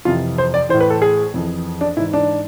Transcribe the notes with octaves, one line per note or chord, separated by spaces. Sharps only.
F2 C3 E3 F4
C5
D5
E3 C5
A2
B4
A4
G#4
F2 E3
D4
G#2 E3 E4
D4